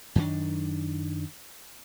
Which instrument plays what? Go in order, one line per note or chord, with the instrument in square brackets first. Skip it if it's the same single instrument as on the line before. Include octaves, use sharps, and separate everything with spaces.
[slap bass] F#2 D#3 D4